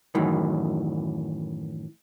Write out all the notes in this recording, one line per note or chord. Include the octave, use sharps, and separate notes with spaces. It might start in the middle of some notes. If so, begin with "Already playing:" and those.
F#2 A2 D#3 E3